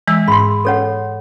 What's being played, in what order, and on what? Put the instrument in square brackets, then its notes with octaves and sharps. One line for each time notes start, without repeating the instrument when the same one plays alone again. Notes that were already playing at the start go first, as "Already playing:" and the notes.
[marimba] E3 G#3 E6
[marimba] G#2 [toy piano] B5 C6
[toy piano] A4 C#5 F#5